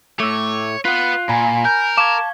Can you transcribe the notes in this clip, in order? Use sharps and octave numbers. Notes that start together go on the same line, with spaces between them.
A2 A3 C#5 D6 E6
F4 B4 F#5 F#6
A#2 G#5 A#5 B5
A#4 G6
F5 A5 C#6 D6 G#6 E7